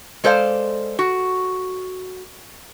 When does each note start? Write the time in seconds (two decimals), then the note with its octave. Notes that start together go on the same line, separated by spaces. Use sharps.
0.24 G#3 A4 C5 D5 F5
0.99 F#4